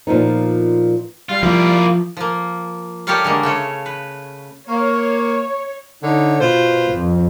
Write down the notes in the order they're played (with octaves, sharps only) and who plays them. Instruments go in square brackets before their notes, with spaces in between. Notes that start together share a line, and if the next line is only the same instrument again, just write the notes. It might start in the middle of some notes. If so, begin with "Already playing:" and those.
[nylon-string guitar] A#2 F3 B3 D#4
[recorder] G3 [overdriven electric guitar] F4
[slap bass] F3 [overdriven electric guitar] A#3 E4
[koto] F3 A#3
G3 G4 A4 A#4 C#5 F5
D3 G#3 A#3
C#3 A3 C#5
B4
[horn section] A#3 [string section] C#5 [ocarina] C#6
[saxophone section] D3 D#4 C#5
[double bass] B2 [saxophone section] F4 B4 C5
[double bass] F2